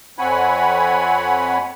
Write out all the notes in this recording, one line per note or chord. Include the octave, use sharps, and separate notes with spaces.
F2 C4 C#5 F#5 G#5 B5